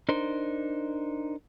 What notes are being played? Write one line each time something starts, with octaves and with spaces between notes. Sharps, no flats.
D4 D#4 A#4 C5